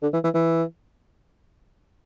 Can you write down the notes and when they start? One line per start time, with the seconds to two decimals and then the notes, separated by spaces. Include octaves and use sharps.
0.02 D3
0.13 E3
0.24 E3
0.34 E3